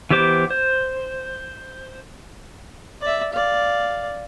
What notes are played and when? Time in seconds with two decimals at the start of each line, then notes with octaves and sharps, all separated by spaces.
0.11 E3 B3 G4 C5 D6
0.51 C5
3.01 D5 E5
3.33 D5 F5